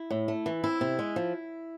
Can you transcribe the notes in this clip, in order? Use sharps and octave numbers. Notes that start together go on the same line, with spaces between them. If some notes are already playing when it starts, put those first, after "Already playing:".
Already playing: E4
A2
A3
E3
C4 E4
C3
G#3
F3